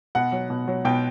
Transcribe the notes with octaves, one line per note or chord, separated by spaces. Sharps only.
B2 F#5
F#3
B2
F#3
B2 G5